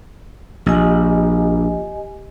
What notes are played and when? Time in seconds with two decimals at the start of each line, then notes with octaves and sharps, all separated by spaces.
0.66 A#1 G4 D#5 G#5